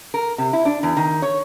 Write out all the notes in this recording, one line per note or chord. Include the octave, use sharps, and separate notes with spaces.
A#4
C3
E4
D4
E2
D#3
C#5